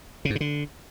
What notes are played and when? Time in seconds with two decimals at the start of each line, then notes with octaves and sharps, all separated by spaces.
0.25 C#3
0.30 G#2
0.35 C#3
0.40 D3